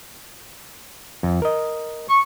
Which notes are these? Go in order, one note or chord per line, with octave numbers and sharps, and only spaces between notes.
F2
A#4 D#5
C#6